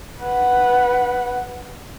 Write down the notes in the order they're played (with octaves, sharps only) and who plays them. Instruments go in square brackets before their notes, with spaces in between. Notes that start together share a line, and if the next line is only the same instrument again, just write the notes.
[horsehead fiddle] B4 F#5